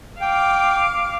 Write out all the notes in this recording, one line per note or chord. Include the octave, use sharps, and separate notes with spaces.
F5 G5 D6